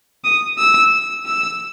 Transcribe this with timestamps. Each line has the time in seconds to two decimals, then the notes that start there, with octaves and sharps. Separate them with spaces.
0.24 D#6
0.58 E6
1.26 E6